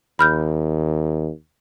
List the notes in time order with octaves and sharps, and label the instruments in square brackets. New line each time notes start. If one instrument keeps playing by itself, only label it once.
[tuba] D#2 [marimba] B5 F6 G6